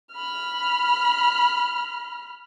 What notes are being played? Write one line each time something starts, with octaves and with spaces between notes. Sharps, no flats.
B5 F6